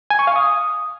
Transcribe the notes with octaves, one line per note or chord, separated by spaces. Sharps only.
G#5
C#6
F5
D#6